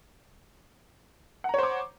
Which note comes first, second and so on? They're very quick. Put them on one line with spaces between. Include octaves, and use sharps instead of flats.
F#5 A#5 C#5 C5 D6